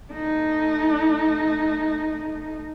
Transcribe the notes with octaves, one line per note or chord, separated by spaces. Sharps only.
A3 D#4